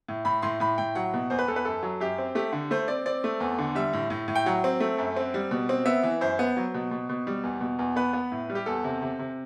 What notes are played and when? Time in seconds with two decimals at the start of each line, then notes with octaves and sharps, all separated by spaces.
0.09 A2
0.25 A2 B5
0.42 A2 C6
0.60 A2 B5
0.78 A2 G5
0.95 F#3 F#5
1.14 B2
1.30 E2 C5
1.39 B4
1.48 E2 A4
1.56 B4
1.65 F#2 A4
1.83 F#3
2.00 F#2 G4
2.18 C4
2.35 A3 G4
2.53 D3
2.71 A3 C5
2.88 C4 D5
3.06 C4 D5
3.24 A3
3.40 E2
3.59 D3
3.75 G3 E5
3.93 A2
4.10 A2
4.28 A2
4.35 G5
4.46 F#3 F#5
4.64 C4
4.80 A3
4.98 F#2
5.16 C4
5.34 G3
5.51 B2
5.69 C4
5.86 B3 E5
6.03 E3
6.21 F#2 C5
6.39 B3
6.57 F#3
6.74 B2
6.91 B2
7.09 B2
7.27 G3
7.44 E2
7.61 B2
7.79 E2
7.96 B3 B4
8.13 B3
8.32 A2
8.50 G3
8.55 G4
8.66 E2 A4
8.84 C3
9.02 C3
9.19 C3